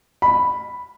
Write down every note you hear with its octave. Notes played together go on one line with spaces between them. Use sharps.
B5